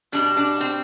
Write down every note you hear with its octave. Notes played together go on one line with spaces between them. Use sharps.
B2 G3 D4
D4
C4